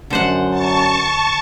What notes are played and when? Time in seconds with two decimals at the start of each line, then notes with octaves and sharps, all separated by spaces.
0.10 F#2 D3 C5 F#5
0.50 A5 C#6